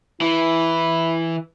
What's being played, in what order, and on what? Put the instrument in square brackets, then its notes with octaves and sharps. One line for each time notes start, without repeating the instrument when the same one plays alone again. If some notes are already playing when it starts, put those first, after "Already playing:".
[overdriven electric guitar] E3 [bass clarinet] E4